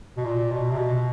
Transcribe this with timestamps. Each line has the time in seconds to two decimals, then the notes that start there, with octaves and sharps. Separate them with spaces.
0.17 B2
0.25 A#2
0.51 B2
0.71 C3
0.78 B2